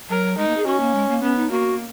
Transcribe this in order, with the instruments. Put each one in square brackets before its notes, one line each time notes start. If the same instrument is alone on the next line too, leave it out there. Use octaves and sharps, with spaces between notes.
[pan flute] F#3 [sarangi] A#4
[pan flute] G#3 [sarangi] D#4
[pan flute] A#3
G#4
[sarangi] C#4 [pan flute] F#4
[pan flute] A#3
G#3
A#3
[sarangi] B3 [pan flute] C#4
[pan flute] D#4
[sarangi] A#3 [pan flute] F#4